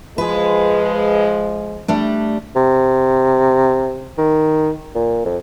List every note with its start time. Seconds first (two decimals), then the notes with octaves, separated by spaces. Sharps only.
0.18 F3 G#3 G#4 B4
1.88 G3 A3 D4
2.56 C3
4.18 D#3
4.95 A#2
5.25 F2